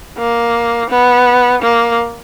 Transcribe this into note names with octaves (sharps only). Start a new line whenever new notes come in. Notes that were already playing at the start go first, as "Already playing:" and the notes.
A#3
B3
A#3